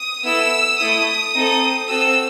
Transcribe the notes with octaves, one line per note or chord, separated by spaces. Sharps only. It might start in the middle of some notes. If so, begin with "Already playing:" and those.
Already playing: D#6
B3 E4 A4 E6
A3 E4 A4 D#6
C4 D#4 A4
C4 F#4 A4 E6